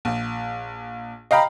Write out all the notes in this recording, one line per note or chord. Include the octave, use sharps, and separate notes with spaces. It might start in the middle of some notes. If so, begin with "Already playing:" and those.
A#1
D#5 F5 G5 A#5 B5